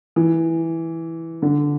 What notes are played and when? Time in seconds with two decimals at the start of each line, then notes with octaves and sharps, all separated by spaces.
0.16 E3
1.42 D3